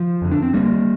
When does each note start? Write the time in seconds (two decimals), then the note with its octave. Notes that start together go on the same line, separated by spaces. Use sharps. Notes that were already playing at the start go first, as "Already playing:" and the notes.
Already playing: F3
0.22 F2 D3
0.32 D4
0.43 C4
0.53 D2 D3 G3 A#3